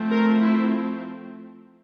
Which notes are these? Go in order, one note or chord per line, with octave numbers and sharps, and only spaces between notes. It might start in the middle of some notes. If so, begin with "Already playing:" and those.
Already playing: F3 A3 C4
A#4
E4